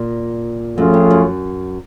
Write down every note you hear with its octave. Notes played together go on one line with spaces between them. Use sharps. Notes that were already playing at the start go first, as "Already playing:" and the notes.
Already playing: A#2
F#2 F3 A3 C#4 F4 G#4
F2
F#2